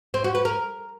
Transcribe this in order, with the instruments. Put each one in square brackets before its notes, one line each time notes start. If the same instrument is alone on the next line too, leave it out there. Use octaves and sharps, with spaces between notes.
[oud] C4
F#4
B4
A#4